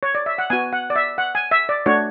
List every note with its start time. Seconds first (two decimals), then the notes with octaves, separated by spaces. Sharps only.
0.03 C#5
0.15 D5
0.26 E5
0.38 F#5
0.50 B3 F#4 G#5
0.73 F#5
0.90 D5
0.96 E5
1.18 F#5
1.35 G#5
1.51 E5
1.69 D5
1.86 A3 D4 F#4 C#5